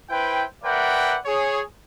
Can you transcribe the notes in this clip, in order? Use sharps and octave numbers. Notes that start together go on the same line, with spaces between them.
E4 B4 C5 G5
A#4 B4 D5 E5 F#5 G5
G#4 C#5